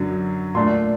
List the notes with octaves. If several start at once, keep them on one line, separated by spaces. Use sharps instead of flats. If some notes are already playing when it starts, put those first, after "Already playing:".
Already playing: F#2 D3 F#3
A#2 A3 D4 C6